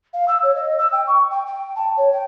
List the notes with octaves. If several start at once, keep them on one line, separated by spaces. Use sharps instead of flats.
F5
E6
C#5
D#5
E6
G5
C#6
G5
G5
A5
C#5
G5